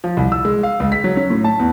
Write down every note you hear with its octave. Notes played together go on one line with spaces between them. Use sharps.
F3
C2
E6
G#3
F5
C#2
B6
F#3
C#4
A2
A5
E2